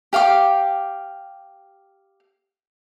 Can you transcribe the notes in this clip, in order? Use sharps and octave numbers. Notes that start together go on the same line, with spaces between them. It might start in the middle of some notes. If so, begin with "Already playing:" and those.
G4 F5 G5 D6